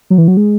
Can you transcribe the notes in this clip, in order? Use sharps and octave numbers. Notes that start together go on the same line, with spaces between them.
F#3
E3
F#3
G#3